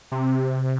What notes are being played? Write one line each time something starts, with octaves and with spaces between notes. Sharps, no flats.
C3